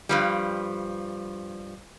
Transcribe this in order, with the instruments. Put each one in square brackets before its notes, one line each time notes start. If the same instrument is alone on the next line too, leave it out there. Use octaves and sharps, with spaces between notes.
[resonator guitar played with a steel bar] G2 F3 G3